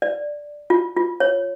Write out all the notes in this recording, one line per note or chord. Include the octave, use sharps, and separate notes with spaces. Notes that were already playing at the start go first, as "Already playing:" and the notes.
D5
F4
F4
C#5